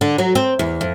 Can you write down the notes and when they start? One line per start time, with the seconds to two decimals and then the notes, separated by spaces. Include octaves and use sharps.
0.01 D3
0.18 F#3
0.35 C4
0.59 E2
0.81 F2